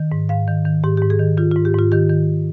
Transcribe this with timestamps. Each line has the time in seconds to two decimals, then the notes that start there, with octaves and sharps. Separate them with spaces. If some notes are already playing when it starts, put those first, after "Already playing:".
Already playing: D#3
0.12 G#2
0.29 G#2 F5
0.48 D#3
0.65 D#3
0.84 G#2 G4
0.97 G#2 G4
1.10 G#4
1.20 D#3
1.38 D#3 F4
1.52 G#2 F4
1.65 G4
1.74 G#2 F4
1.92 D#3 G4
2.10 D#3